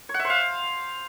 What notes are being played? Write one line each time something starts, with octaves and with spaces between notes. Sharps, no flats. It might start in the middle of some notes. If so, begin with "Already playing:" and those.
C#5
F#5
E5
C5
F5